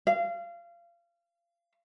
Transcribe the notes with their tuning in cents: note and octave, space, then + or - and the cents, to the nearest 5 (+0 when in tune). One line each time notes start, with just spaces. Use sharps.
F5 -25